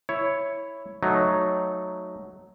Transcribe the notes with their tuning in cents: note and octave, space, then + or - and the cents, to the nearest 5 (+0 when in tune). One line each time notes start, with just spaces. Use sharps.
E4 +0 C#5 +0
F#3 +0 A3 -5 D#4 -5